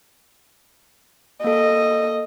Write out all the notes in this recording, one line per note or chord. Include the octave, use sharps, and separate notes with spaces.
A#3 A4 D#5